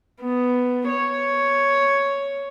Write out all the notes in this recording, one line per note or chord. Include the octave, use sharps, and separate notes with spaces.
B3
C#5